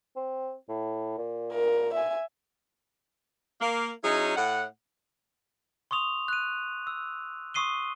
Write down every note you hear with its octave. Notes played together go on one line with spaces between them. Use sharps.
C4
A2
A#2
A#4
E5 G#5
A#3
F#3 C#4 D#4 E4 G#4
A2 F#5
C6 C#6 D#6 F7
F#6 D#7
E6
C6 C#6 D#6 C7 D#7 G7